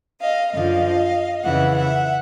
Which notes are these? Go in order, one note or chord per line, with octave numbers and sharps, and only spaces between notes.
D#5 F5
F#2 D3 F3 D#5 F5
F2 C#3 E3 E5 F#5
E5 F#5